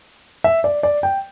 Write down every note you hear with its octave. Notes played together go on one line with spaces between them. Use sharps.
E5
D5
D5
G5